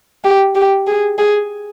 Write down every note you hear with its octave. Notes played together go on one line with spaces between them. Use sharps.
G4
G4
G#4
G#4